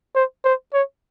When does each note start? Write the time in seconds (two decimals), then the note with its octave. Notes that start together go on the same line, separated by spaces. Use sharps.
0.15 C5
0.45 C5
0.73 C#5